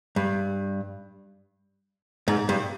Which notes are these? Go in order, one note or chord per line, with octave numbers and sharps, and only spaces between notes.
G2
G#2
G2